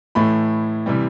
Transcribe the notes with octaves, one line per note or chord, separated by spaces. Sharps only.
A2 E3 A3 B5
C3 E3 G3